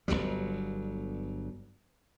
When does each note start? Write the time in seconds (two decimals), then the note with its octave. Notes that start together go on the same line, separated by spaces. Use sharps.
0.08 G1 C#2 F#3 G3